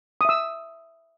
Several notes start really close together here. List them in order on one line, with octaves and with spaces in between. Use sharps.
D#6 E5 E6